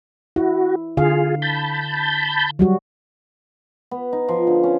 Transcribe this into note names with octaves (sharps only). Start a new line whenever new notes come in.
E4 F#4
D3 F4 G#4 F5
A5 B5 G6
F#3 G3 F#4
B3
D#4
F3
D3
C#4